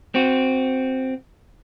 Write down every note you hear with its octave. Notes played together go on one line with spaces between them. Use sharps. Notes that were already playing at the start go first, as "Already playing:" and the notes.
C4 F#4